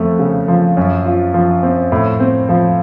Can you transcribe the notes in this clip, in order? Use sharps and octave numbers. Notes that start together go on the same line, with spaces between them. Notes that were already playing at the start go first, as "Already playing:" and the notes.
Already playing: F2 A3
C#3
F3
F#2
F4
F3
C4
A2
C4
F3